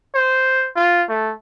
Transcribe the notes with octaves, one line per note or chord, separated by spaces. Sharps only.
C5
F4
A3